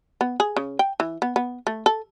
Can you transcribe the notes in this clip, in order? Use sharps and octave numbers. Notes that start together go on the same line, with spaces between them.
B3
G#4
C#3
G5
E3
B3
B3
A3
A4